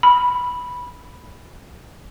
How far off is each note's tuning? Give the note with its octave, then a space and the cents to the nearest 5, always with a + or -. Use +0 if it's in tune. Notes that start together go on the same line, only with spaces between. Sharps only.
B5 -5